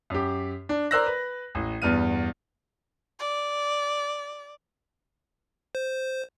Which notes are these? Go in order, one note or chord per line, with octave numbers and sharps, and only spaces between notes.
F#2 G4
D4
A#4 C5 D5 E6 F#6 A#6
B4
A1
E2 G2 B3 F6 D#7
D5
C5